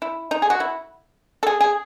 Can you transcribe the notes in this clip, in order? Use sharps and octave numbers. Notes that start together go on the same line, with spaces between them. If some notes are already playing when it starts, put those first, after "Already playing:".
E4
D#4
G#4
F#4
E4
A4
G#4
G#4